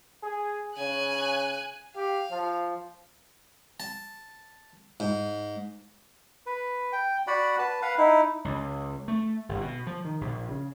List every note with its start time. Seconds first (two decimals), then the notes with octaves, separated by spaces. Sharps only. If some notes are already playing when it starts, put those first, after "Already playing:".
0.23 G#4
0.77 C#3 G#5 F#6
1.96 G4 F5
2.31 F3
3.80 A5
5.00 G#2
6.46 B4
6.92 G5
7.27 F#4 D5 F#5 B5
7.59 B4 A5
7.82 B4 F5 F#5
7.98 D#4 E4
8.45 C#2
9.08 A3
9.49 G1
9.61 B2
9.87 F3
10.05 D#3
10.21 A#1
10.48 C#3